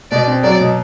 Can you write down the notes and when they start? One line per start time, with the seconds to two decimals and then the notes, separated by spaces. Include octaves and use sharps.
0.11 B2 D5
0.27 C4
0.44 F#3 D5
0.60 B2